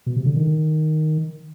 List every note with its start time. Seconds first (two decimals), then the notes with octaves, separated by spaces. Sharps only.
0.06 B2
0.16 C3
0.26 D3
0.36 D#3